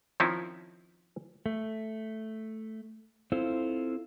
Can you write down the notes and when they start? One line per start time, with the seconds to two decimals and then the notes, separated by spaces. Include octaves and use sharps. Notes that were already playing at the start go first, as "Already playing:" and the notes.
0.20 D#3 F3 C4 C#4 D#4 E4
1.46 A3
3.32 C4 E4 F4 A4 C5